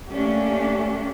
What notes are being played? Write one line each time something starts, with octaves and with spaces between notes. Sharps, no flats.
A3 A#3 C#4 D4 G4